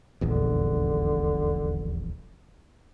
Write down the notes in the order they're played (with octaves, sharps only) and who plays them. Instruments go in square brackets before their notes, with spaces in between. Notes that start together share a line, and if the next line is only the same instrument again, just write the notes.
[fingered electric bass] D#1 A#1 E2 [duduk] D3